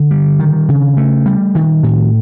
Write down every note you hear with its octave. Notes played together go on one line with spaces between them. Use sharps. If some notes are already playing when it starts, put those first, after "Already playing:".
Already playing: D3
G3
D#3
C#3
A3
G3
D#3
A2